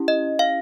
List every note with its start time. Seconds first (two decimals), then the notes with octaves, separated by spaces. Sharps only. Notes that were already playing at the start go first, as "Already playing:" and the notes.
Already playing: C#4 E4 G4
0.08 D#5
0.39 F5